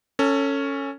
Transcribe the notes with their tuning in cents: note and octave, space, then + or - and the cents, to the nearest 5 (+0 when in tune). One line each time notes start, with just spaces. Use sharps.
C#4 +0 A4 +25